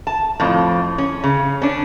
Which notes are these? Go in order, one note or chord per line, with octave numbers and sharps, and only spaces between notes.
A5
F2 A2
C#4
C#3
C#4 D4